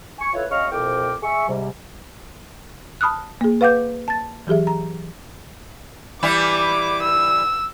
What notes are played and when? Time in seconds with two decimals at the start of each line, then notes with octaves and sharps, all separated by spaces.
0.19 G#5 C#6
0.34 E4 F4 A4 B4 C#5
0.50 F#2 C#3 D#5 F5 C#6 F6
0.71 C2 F2 B2 A#4 G5 D6
1.23 G#4 E5 C#6
1.48 G#2 C3 G3
3.01 A5 B5 D#6 F6 F#6
3.41 A#3 G#4
3.61 B4 F5 F#5 D6 G6
4.08 A5 A6
4.47 E3 F#3 G4 G#4 E5
4.67 A#5
6.23 E3 G3 E4 D6
7.03 E6